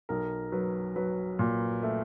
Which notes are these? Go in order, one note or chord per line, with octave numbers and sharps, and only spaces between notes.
B1 A#4
F#3 B4
F#3 B4
A#2
A3